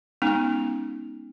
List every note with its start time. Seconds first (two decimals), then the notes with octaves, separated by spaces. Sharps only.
0.22 G#3 B3 C#4 D#4